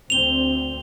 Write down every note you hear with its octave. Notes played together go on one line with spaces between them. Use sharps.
D2 C4 F7 G7